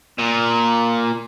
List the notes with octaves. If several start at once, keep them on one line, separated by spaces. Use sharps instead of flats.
A#2